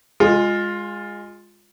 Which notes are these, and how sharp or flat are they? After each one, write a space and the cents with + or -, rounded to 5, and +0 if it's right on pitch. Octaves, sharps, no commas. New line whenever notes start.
G#3 -15 F4 +15